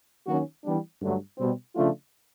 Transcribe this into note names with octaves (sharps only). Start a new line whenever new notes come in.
D#3 F#3 A#3 C#4 F#4
E3 G3 B3 D4
G2 D3 F#3 A3
B2 G3 C4
C#3 F3 A3 D4 F4